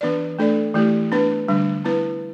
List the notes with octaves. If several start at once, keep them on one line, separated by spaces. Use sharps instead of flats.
E3 B3 D4 B4 D5
A3 D4 A4 D5
E3 A3 E4 G4
B3 D4 B4
D3 G3 D4
B3 E4 B4